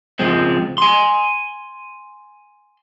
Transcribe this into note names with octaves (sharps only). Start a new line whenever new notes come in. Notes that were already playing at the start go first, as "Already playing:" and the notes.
C#2 F3 G#3 C4
G#5 C6